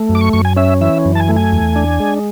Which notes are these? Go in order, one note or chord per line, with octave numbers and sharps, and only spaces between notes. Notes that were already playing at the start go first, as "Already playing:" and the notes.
Already playing: A3
F#2
D6
C#6
F#2 C#6
G#5
C#4 E5
E3 E5
F#2
A5
G#5
A3
G#5
E2
D4
G#3